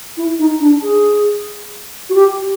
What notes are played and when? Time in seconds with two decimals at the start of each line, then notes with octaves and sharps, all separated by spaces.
0.17 E4
0.39 D#4
0.61 D4
0.83 G#4
2.10 F#4
2.14 G4